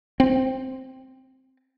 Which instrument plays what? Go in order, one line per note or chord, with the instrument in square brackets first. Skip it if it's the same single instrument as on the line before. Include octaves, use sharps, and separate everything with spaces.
[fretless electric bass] C4